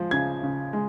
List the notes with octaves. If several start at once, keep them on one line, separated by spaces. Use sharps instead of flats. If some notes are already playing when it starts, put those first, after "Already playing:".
Already playing: F3 G#3
C#3 G#6
C#3
G#3